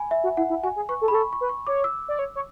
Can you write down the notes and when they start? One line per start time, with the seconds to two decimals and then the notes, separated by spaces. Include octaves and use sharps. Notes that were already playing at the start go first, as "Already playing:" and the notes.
Already playing: G#5 B5
0.11 E5
0.24 F#4
0.37 E4 F#5
0.50 E4
0.63 F#4 G#5
0.76 G#4
0.89 B4 C#6
1.01 A4
1.08 B5
1.11 G#4
1.14 A4 C#6
1.33 C#6
1.41 B4
1.49 C#6
1.67 C#5 D6
1.84 E6
2.08 D5
2.19 C#5
2.35 C#5